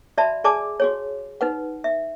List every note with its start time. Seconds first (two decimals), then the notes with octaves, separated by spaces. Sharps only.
0.18 F#4 D5 E5 A5 B5
0.44 G#4 D5 G#5 A5 D6
0.80 F#4 G#4 C#5
1.41 D#4 B4 F#5
1.84 E5